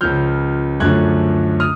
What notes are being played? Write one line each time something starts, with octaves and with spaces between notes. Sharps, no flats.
C#2 C#3 F3 F6 G6
F#2 D3 F3 A3 C#4 F#6 G#6
D#6 F6